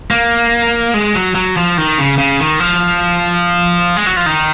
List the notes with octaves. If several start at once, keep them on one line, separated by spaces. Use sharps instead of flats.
A#3
G#3
F#3
F#3
F3
D#3
C#3
C#3
D#3
F3
G#3
F#3
F3
D#3